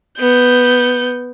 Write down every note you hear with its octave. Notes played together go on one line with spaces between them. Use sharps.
B3 G6